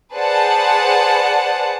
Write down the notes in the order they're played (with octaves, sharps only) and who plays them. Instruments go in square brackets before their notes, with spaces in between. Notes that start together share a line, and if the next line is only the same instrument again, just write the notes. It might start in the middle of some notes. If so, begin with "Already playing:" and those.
[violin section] G#4 B4 C5 D5 F#5 A5